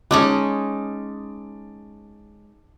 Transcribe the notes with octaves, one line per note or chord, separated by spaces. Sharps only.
G#3 C#4 D#4 A5 D6